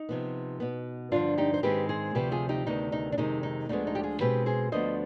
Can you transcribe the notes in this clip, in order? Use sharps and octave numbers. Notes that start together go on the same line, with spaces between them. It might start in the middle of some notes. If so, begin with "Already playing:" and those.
Already playing: D#4
C3 F3 B3
B2 B3
G2 D3 F3 D4 F4
D#4 G4
C5
G#2 D#3 G#3 C4 G4 B4
G#4 C5
D2 C3 F3 G4 B4
F4 G#4
D#4 G4
D2 C3 D#3 B3 D#4
D#4
D4
F2 C3 D#3 G#3 D#4
D#4
D2 D3 F3 G#3 B3 D#4
D#4
G4
F4 G#4
B2 G#3 C4 G4 B4
G#4 C5
D2 D3 F3 B3 C5 D#5